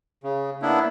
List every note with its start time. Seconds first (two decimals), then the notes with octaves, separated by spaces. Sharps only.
0.23 C#3
0.62 A#3 B3 D4 E4